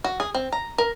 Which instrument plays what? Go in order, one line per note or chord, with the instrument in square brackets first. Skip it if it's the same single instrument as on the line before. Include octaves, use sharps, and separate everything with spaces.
[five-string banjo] F#4
G#4
C4
A#5
A#4